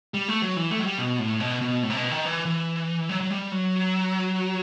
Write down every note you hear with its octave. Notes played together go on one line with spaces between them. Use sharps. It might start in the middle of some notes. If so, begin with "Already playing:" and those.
G3
A3
F#3
E3
A3
F#3
G3
B2
A2
B2
B2
A2
C3
B2
D#3
E3
E3
F#3
F#3
G3
F#3